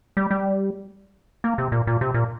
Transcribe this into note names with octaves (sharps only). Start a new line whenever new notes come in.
G3
G3
A#3
C3
A#2
A#2
C3
A#2